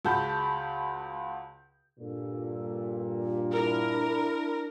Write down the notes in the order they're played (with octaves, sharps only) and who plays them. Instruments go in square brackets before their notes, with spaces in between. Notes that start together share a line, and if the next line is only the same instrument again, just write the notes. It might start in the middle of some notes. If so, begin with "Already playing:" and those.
[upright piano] C#2 F#4 G#4 A5 B5 G6
[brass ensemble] G2 A#2 [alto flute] A4
[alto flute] D4 [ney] E4 [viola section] A#4